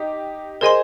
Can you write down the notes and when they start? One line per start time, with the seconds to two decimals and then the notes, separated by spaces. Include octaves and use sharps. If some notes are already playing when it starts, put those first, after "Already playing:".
Already playing: D#4 G4
0.61 G#4 A#4 C5 D#5 G#5 C6